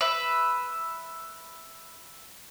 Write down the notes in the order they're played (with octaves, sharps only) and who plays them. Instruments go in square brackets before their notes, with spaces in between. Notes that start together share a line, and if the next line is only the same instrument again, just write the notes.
[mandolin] B4 E5